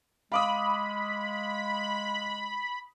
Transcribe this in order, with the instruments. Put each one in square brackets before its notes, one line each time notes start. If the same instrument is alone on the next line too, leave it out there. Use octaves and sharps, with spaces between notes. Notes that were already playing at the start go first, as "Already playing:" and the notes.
[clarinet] G#3 [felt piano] F5 D6 D#6 [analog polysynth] B5